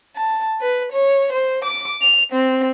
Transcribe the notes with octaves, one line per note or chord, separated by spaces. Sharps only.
A5
B4
C#5
C5
D6
F7
C4